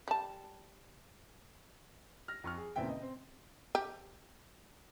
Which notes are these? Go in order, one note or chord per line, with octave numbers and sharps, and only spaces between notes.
G3 A5
F6 A#6
F2 C#6 F6
G#4
E2 A#2 C#3 C4 E5 G5
D#5
C4
G4